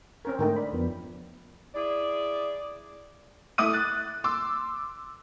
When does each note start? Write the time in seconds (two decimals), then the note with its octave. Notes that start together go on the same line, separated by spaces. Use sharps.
0.25 C4 C#4 A#4
0.39 G#2 D3 A3 D#4 A#4 G5
0.56 D5 B5
0.73 F2 F3 B3
1.75 E4 G#4 D5
3.58 A3 E4 D6 D#6 D#7
3.73 F#6 A6
4.24 C6 D6 E6